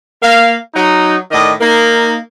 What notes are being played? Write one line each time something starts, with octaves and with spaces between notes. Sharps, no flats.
A#3 F5
F#3 D#4
A2 D#3 D5 D#5
A#3 D#4